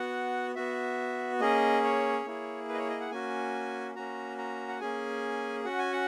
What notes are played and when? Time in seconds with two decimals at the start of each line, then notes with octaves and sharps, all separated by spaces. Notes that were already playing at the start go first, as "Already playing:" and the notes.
Already playing: B3 F#4 F#5
0.55 B3 F#4 E5
1.40 A#3 C#4 G#4 D#5
1.84 C#5
2.25 A#3 E4 G#4
2.69 B4
2.74 D#5
2.78 C#5
2.89 D#5
3.01 F#5
3.11 A#3 C#4 F#4 G#5
3.95 A#3 C#4 F#4 A#5
4.38 A#5
4.68 F#5
4.80 A#3 C#4 G#4 G#5
5.65 C#4 F#4 F#5
5.79 G#5
5.92 F#5